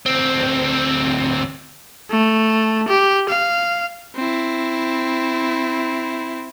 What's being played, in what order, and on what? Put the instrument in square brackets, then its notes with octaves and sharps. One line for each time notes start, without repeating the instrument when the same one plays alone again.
[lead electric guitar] D2 C4
[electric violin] A3
G4
F5
C4 E4